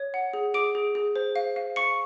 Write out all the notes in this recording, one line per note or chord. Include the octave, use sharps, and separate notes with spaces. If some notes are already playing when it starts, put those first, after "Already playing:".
Already playing: C#5
F#5
G#4
G#4 D6 D7
G#4
G#4
C5
F5
F5
F5 C#6 C#7